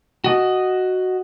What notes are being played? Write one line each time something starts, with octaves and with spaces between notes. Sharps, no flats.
F#4 D#5